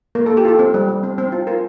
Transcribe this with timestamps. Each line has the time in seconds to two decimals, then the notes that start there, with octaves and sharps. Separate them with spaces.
0.15 A#3 A#4
0.26 A4
0.30 A#3
0.37 G4
0.45 F4 A4
0.59 C4
0.74 G3
0.88 G3
1.03 C4
1.18 C4
1.32 F4
1.47 F4 A#4